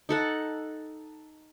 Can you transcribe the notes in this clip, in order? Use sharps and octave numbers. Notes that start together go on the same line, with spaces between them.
D#4 A4 F#5